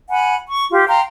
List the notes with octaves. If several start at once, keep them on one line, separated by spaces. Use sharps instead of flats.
F#5 G#5 B5
C#6
F4 G4
F5 G5 A#5 C6